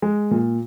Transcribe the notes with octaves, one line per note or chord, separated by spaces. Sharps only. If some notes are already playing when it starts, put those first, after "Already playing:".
G#3
A#2